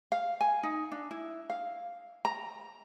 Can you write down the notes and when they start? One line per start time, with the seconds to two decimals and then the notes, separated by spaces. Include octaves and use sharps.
0.12 F5
0.41 G#5
0.63 D#4
0.92 D4
1.11 E4
1.50 F5
2.25 A#5